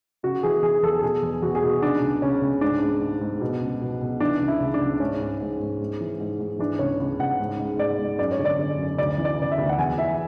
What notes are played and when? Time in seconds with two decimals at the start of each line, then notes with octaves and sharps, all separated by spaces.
0.23 C#3 F#4
0.43 E3 G#4
0.62 E3 G#4
0.83 E2 A4
1.02 B2 G#4
1.22 E2
1.42 E2 F#4
1.55 G#4
1.63 B2
1.69 F#4
1.82 C#3 D4
2.02 C#2
2.22 C#3 C#4
2.41 C#2
2.61 G#2 D4
2.82 G#2
3.01 G#2
3.21 G#2
3.41 B2
3.61 C#2
3.81 B2
4.01 B2
4.20 E3 D4
4.41 C#2
4.48 E4
4.60 C#2
4.74 D4
4.81 C#2
5.00 G#2 C#4
5.21 G#2
5.40 G#2
5.60 G#2
5.80 G#2
6.01 E3
6.20 G#2
6.39 G#2
6.59 E3 D4
6.79 C#2 C#5
7.00 C#2
7.19 C#2 F#5
7.40 G#2
7.59 G#2
7.78 G#2 D5
7.99 G#2
8.18 F#2 D5
8.32 C#5
8.39 D3
8.45 D5
8.59 D3
8.78 F#2
8.98 D2 D5
9.18 E3
9.25 D5
9.39 C#3 D5
9.51 E5
9.58 D2
9.69 F#5
9.77 E2 G#5
9.97 E3 E5